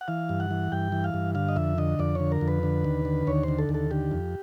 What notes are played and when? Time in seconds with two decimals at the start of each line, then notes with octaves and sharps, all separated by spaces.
0.01 F#5
0.08 E3 F5
0.29 G2
0.40 F#5
0.51 E3
0.72 G2 G5
0.92 E3
1.04 F5
1.14 G2
1.35 D3 F5
1.49 D#5
1.56 F2 E5
1.78 D3 D#5
1.99 F2 D5
2.15 D3 C#5
2.32 A#4
2.41 F2
2.48 B4
2.63 D3
2.84 D#2
3.05 D3
3.27 D#2 C#5
3.43 D3 C5
3.59 A4
3.69 D#2
3.74 A4
3.91 D3 G4
4.11 F2